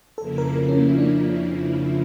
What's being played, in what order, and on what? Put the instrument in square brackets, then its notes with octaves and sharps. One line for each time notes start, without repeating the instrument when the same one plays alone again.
[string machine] F2 C#3 F3 A#3 E4 [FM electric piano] A4
[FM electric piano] A#4
A#4
C#4
A#3
E4
D4